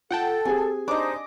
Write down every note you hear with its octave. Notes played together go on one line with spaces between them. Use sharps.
F4 A4 F#5 G5 A5
C4 G4 G#4 G#5
D4 D#4 C5 D#5 D6